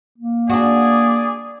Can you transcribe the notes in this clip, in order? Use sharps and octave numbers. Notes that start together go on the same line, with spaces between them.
A#3
D4 F#4 G#4 D5